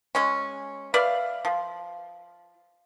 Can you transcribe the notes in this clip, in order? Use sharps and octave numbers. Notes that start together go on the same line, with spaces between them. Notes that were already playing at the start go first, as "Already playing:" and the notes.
G#3 C#4
B4 D5 E5 F5
F3